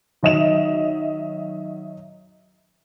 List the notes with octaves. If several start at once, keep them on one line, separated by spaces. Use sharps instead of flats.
D#3 F#3 D#5 E5 E7 F7